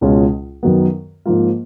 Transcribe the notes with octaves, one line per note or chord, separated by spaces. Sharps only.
C#2 B2 G#3 C#4 F4
F#2 D#3 F#3 B3
G#2 F3 A#3 F4